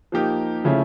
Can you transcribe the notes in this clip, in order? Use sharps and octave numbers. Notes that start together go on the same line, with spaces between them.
F3 A#3 D#4 G4 A#4
C#3 F3 A3 C#4 E4